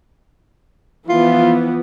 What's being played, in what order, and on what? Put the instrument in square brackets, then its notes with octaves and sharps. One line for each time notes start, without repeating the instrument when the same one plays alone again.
[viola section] E3 F3 B3 [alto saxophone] F4